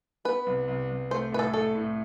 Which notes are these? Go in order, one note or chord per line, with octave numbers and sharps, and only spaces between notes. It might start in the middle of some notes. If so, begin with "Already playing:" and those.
B3 B4
C2
C2
C2
A3 C5
A2 B4
A4
A3 A4
A2